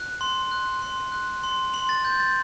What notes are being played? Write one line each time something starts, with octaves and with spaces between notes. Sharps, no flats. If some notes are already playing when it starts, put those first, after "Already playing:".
Already playing: F#6
C6
F#6
C6
F#6
C6
C6 F#7
A6
G6
A6